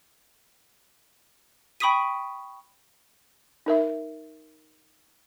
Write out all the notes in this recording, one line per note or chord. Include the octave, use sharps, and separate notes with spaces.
G5 B5 C#6 D#6 B6 D#7
D#4 A#4 E5